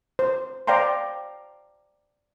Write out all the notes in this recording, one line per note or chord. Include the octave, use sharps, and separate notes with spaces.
C5
C5 D5 F5 G5 A#5 C6